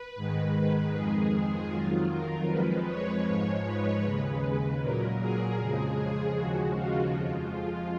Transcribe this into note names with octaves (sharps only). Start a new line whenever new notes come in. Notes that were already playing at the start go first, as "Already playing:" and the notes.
Already playing: B4
G#2 D#3 G#3
F2 D#3 G#3 G#4
F2 D#3 F#3 F4
A#4
F2 F3 G#3 B4
C#5
G#2 F3 G#3
B4
D#2 C#3 G#3
A#2 F#3 A#4
G#4
F2 C#3 F3 G#3
D#2 C#3 F3 G#3 F#4
F4
F2 F3 G#3
F4